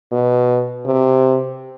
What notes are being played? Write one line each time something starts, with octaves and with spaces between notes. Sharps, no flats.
B2
C3